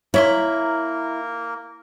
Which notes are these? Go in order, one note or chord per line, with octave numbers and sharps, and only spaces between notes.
A#3 E4 A#4 C#5 E5 C6